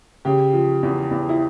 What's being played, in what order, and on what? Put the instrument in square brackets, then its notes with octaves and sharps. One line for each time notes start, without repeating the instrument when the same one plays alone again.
[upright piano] C#3 G4
F3
E2
E2
E4